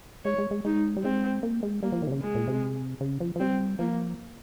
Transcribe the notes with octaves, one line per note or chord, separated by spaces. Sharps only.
G#3 C#5
G#3
G#3
G#3 D#4
G3
G#3 C4
A#3
G#3
G3 A#3
F3
D#3
C3
C#3
G#3
A#2
C3
C#3
F3
F3
G3 C4
F3 A#3